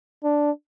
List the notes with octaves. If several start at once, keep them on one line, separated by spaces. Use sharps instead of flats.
D4